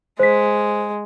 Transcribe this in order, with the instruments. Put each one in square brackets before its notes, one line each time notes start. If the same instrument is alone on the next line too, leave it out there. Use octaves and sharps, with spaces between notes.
[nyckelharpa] G#3 [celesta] C5 B6